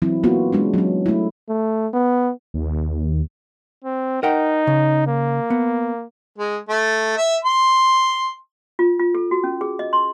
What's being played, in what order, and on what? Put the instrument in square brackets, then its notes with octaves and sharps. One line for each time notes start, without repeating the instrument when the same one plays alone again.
[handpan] E3 F#3 C4 E4
A#3 B3 F4 F#4
G#3 C#4 D4
F#3 C#4
A3 E4
[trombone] A3
B3
[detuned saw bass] D#2
[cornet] C4
[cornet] D#4 [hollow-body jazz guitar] A#4 F#5 G5
[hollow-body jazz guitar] C#3
[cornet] A#3
[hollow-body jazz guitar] B3
[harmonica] G#3
A3
E5
C6
[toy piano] F4
F4
A4
F#4
C#4
G#4
D#5
C6